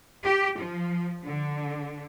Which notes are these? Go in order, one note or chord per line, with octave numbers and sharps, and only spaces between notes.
G4
F3
D3